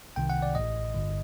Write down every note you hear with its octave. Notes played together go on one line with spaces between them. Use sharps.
C2 C3 D#3 G5
F#5
D5
A1 A2 D#5
G1 G2 D3